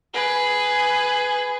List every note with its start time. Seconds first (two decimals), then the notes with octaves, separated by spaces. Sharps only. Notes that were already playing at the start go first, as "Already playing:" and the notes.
0.14 G#4 B4